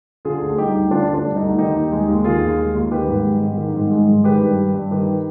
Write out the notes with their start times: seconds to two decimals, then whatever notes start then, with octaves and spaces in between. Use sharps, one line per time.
0.25 D3 F4 G#4
0.42 D2
0.58 G3 D#4 G4
0.75 D2
0.91 D3 D4 F4
1.08 D2
1.14 D4
1.25 G3
1.36 D#4
1.42 D2
1.58 D#3 D#4 G4
1.75 D#2
1.92 G#3
2.09 D#2
2.24 D#3 F4 G#4
2.41 D#2
2.58 G#3
2.75 D#2
2.91 D#3 G4 B4
3.08 G#2
3.25 G#3
3.41 G#2
3.58 D#3
3.75 G#2
3.91 G#3
4.08 G#2
4.24 D#3 G4 B4
4.41 G2
4.58 G3
4.74 G2
4.91 D#3 G4 B4